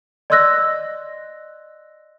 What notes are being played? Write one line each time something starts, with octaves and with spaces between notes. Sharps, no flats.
D5 D#5 C6 E6 F#6 A#6